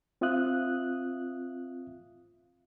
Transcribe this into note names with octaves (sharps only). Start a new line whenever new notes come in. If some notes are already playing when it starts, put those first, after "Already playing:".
C4 F4 E5 F5 D#6 F#6